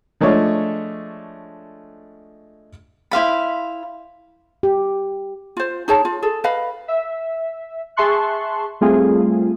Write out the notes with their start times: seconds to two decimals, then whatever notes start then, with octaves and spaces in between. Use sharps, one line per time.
0.21 F3 G#3 A3 D4 C#5
3.11 E4 C5 F5 B5
4.63 G4
5.57 F4 C5
5.88 D#4 G#4 C#5 A5
6.05 F4
6.22 G#4 A4
6.44 B4 D#5 F5 B5
6.88 E5
7.97 G#4 E5 A5 C6 C#6 F#6
8.81 G3 A3 C4 F4 G#4